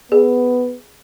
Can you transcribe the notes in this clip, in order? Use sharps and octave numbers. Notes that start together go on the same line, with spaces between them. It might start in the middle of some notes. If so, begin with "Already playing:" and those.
B3 G#4